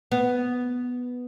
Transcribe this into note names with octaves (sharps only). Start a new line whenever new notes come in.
B3